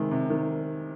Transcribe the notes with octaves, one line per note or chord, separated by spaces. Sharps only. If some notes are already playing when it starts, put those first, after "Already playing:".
Already playing: C3 D#3 G#3
C3
D#3